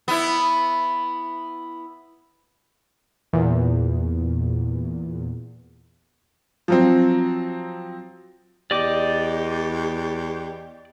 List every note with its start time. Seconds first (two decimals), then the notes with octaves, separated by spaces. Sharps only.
0.08 B3 E4
3.33 E2 A#2
6.68 F3 F#3 C4
8.71 E2 G4 D5 D#5 D6